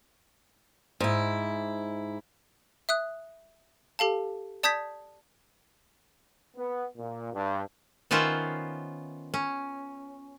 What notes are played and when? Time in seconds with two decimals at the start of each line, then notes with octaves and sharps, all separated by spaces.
1.00 G#2 E4
2.89 E5 D#6 F#6
3.99 G4 A4 F5 A5
4.63 D5 A5 D#6 G6 G#6 B6
6.57 B3
6.97 A#2
7.34 G2
8.11 D#3 B3 C#4 F4 C5 E5
9.34 C#4